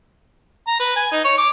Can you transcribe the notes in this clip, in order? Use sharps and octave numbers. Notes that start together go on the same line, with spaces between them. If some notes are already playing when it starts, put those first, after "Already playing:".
A#5
B4
G#5
D#4
C#5
D6